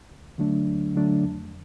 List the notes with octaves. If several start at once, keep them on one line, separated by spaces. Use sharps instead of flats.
D2
D3 F#3 A3 D4
D2
D3 F#3 A3 D4
F2